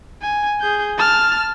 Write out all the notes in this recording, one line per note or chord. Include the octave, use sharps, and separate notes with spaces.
G#5
G#4 G6
A5 F6